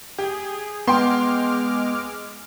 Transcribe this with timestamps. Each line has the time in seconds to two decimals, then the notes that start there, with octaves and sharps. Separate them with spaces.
0.18 G4 G#4
0.88 G#3 B3 G5 C6 D6 F6